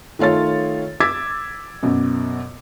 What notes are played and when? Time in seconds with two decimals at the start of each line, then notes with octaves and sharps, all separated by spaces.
0.19 D#3 A3 F4 C#5 A6
1.00 D6 E6 G#6 A6 B6
1.83 F#2 B2